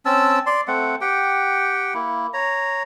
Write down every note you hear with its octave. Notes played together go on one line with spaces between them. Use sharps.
C4 C#4 A5 E6
D5 C6
A3 C4 F#5
G4 F#5 G5
A#3 E4
C#5 A#5